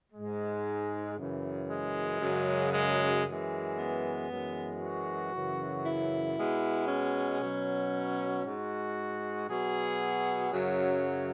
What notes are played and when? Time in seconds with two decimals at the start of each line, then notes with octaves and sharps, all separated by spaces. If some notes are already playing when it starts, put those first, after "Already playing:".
0.13 G#2 G#3
1.17 F#2 C#3 E3
1.69 G#3
2.20 F#2 C#3 F#3
2.73 G#3
3.24 F#2 E3 G#3
3.77 B3
4.29 F#2 E3 G#3
4.80 F#4
5.32 F#2 C#3 E3
5.84 E4
6.36 B2 G#3
6.88 C#4
7.40 B2 F#3
8.44 G#2 G#3 F#4
9.48 B2 F#3 G#4
10.52 F#2 C#3 F#3